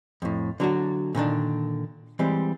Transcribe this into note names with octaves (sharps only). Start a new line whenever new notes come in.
F2 A2
D3 F#3 D4 F#4
A#2 D3 D#3 D4
E3 G3 G#3 C4